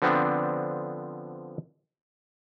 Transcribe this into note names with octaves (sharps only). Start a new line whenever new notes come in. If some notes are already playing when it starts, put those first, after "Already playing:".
D3 F3 B3 C4 D4